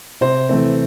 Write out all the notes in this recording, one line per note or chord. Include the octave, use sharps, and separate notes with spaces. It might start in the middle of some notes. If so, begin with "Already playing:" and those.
C3 C5
E3 A3 C4